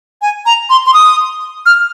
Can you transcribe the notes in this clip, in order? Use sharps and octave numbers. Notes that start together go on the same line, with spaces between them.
G#5
A#5
C6
C6
D#6
F6